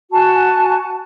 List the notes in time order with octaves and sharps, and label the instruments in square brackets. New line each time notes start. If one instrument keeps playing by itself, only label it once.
[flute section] F#4 G#5 A5